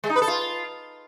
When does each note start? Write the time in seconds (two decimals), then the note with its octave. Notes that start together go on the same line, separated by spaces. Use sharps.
0.04 G#3
0.10 D#4
0.16 B4
0.22 A4
0.28 F4